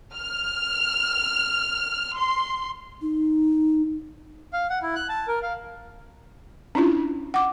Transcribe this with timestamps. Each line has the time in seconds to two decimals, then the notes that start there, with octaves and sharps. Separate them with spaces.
0.15 F6
2.17 C6
3.02 D#4
4.53 F5
4.70 F#5
4.83 E4
4.96 F#6
5.09 A5
5.28 A#4
5.43 F5
6.75 C#4 D4 E4 F4
7.34 F#5 D6